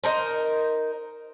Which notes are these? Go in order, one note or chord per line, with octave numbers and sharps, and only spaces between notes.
D#4 A#4 C5